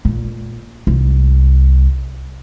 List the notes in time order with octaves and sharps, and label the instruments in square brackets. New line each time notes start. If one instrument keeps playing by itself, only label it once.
[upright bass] A#2
C2